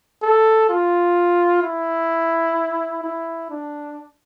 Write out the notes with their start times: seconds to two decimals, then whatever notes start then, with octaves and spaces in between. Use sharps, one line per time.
0.23 A4
0.69 F4
1.62 E4
3.04 E4
3.50 D4